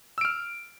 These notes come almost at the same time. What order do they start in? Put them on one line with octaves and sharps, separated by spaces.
E6 D7 F6